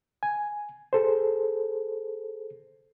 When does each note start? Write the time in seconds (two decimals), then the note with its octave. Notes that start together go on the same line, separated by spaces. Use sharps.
0.23 G#5
0.93 G#4 A4 C5